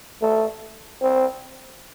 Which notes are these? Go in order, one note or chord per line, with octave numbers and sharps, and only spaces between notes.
A3
C4